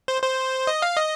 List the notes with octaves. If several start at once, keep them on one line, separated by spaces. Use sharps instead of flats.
C5
C5
D#5
F5
D#5